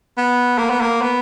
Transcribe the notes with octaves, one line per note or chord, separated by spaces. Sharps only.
B3
A#3
B3
A#3
B3